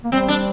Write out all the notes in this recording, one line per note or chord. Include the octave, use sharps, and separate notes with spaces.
A#3
G3 C4
D4